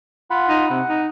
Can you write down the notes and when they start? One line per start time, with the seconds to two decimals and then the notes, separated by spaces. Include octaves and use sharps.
0.31 F4 F#5 B5
0.49 D#4
0.70 C3 F#5
0.89 D#4